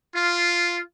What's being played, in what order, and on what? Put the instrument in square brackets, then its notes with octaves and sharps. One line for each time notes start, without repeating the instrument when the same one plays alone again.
[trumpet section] F4